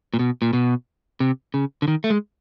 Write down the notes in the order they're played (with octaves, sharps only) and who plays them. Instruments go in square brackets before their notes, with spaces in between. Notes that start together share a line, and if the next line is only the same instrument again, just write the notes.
[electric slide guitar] A#2
B2
A#2
B2
C3
C#3
D3
D#3
A3
G#3